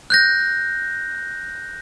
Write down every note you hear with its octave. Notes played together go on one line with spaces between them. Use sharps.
F#6 G6 A#6